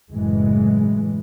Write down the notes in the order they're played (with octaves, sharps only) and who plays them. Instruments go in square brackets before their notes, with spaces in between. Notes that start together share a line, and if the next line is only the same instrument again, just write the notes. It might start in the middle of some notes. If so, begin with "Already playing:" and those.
[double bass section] F#1 A2 E3 G#3